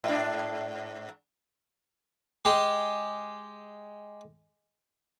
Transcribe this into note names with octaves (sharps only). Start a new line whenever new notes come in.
G#2 D4
G#3 G4